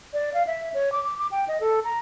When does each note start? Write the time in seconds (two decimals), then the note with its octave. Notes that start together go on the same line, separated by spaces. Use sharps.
0.13 D5
0.34 F5
0.47 E5
0.74 C#5
0.92 D6
1.04 D6
1.19 D6
1.31 G5
1.48 D#5
1.61 A4
1.84 A#5